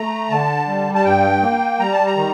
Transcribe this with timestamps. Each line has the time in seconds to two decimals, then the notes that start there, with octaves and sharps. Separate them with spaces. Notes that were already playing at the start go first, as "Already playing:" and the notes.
Already playing: A3 A#5
0.30 D3 A5
0.67 G3
0.95 A5
1.05 G2 G5
1.42 A#3
1.79 G3 A#5
1.93 A5
2.06 A#5
2.16 D#3